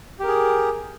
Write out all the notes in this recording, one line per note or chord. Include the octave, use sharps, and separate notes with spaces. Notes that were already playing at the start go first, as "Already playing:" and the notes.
G4 G#4 A#4